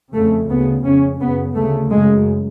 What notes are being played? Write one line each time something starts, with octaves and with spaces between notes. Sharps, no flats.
F2 C#3 A3
D2 C#3 B3
F2 C#3 C#4
F#2 C#3 B3
D2 C#3 A3
F#2 C#3 G#3